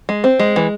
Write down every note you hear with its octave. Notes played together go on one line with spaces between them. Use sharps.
G#3
C4
G#3
E3